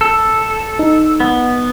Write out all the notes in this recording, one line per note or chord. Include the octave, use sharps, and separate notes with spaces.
A4
D#4
B3